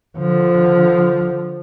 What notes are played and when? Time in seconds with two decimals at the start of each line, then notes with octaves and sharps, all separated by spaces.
0.18 D3 F3